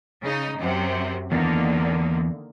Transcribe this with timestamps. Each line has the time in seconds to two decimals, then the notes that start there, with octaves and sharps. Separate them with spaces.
0.23 C#3 D#4
0.58 F#2 C3
1.32 E2 D3 D#3 A#3